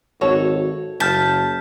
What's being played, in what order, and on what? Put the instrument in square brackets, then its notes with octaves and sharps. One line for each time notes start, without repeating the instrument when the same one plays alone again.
[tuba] G#1 [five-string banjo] F#4 A4 C#5
[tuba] F#1 [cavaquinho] A5 [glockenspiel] F6 G6 B6